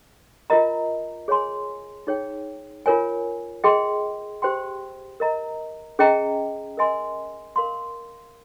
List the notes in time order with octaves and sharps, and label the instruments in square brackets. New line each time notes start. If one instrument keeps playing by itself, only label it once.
[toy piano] F4 A#4 D#5 A#5
G#4 C#5 G#5 C6
D#4 G#4 C#5 G5
F4 A#4 C#5 G#5
G#4 D#5 G5 C6
G4 C5 G5 C6
A#4 D#5 A#5
C#4 G#4 D#5 G5 A#5
A#4 D#5 G#5 C6
A#4 F5 C6